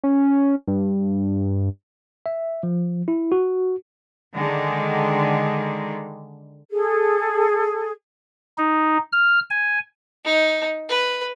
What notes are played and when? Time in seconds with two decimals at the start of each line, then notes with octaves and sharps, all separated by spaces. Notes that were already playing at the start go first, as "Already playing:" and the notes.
0.04 C#4
0.67 G2
2.26 E5
2.63 F3
3.08 E4
3.32 F#4
4.34 D3 D#3 G#3
6.71 G#4 A4
8.58 D#4
9.12 F6
9.50 G#5
10.25 D#4
10.89 B4